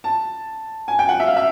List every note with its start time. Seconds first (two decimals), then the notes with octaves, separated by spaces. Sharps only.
0.04 A5
0.88 G#5
0.99 G5
1.09 F#5
1.20 E5
1.27 F5
1.36 E5